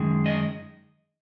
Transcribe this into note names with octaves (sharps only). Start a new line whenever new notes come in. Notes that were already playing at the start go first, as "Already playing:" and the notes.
Already playing: F#2 D#3 G#3
D#5